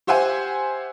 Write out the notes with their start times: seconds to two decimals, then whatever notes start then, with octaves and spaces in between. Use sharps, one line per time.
0.07 G4 C5 E5 F#5 G#5